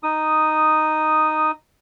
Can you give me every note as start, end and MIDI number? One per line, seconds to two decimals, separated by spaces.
0.03 1.51 63
0.03 1.51 87